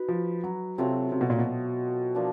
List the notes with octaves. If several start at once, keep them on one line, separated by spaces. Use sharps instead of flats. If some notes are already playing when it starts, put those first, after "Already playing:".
Already playing: D#4 F#4 B4
F3
F#3
C3 F#3 A3 C4 F4
C3
B2
A#2
B2
F3 A#3 D4